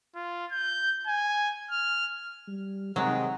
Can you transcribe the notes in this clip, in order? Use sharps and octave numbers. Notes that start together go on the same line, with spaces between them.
F4
G6
G#5
F6
G3
C3 D#3 F#3 G#3